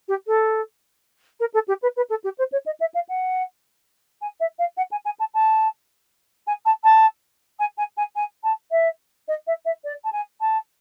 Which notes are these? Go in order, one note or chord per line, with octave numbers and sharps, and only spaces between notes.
G4
A4
A#4
A4
G4
B4
B4
A4
G4
C5
C#5
D#5
E5
F5
F#5
G#5
E5
F5
F#5
G#5
G#5
A5
A5
G#5
A5
A5
G#5
G#5
G#5
G#5
A5
E5
D#5
E5
E5
D5
A5
G#5
A5